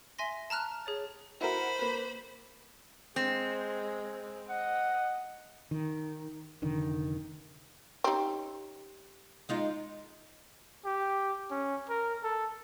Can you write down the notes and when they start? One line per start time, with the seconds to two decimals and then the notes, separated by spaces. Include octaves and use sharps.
0.19 E5 G#5 C6 A#6
0.50 A5 A#5 F6 F#6
0.86 G#4 C#5 A6
1.41 E4 F#4 A#4 C5 B5
1.79 A#3 B4
3.16 G#3 C4
4.49 D#5 F#5
5.71 D#3
6.62 F1 D3 D#3
8.04 C4 C#4 D#4 G4 C#5
9.49 G#3 D#4 F4
10.85 G4
11.51 C#4
11.89 A#4
12.23 A4